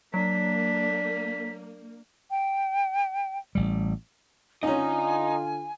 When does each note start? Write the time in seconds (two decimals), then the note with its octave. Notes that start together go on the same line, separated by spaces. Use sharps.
0.14 F#3 A#3 D4 B6
2.31 G5
3.55 A1 G3
4.63 D3 C#4 D#4 F4 D#5 G#5 A#5